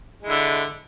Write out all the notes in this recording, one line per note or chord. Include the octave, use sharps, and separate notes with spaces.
D3 G#3 E4